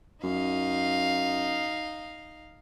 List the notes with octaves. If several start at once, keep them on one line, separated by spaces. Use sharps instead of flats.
F#2 D#4 F5